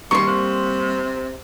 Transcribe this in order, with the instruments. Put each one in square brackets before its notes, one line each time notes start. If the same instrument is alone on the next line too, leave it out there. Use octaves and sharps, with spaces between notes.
[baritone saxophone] D#3 [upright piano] G3 A#3 [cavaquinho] C6 C#6
[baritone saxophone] C3